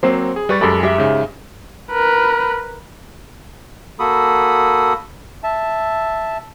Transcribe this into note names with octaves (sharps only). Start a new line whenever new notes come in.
F#3 A#3 C4 C5
G#4
G3 B4 C#6 A6
F#2 G#3 G4 A4 B5
G4 E5
G#2 C#3
A#4 B4
A#3 F#4 A4 B5 D#6
E5 A5